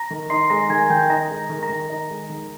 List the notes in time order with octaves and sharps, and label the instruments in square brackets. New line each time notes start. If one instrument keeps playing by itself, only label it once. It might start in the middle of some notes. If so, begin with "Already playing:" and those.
Already playing: [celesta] A#5 A#6
[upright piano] D#3
[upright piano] D#4 [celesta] C6 C7
[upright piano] G#3 [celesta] A#5 A#6
[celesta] A#6
[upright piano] D#3 [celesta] G#5 G#6
[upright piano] D#3 [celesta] G5 G6
[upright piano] D#4 [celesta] A#5 A#6
[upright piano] G#3
D#3
[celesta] A#5 A#6
[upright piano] D#3
D#4
G#3
D#3